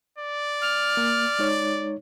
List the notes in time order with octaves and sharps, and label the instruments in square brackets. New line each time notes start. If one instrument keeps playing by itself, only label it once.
[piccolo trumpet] D5
[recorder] F6
[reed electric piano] A#3
G#3 D#4 C#5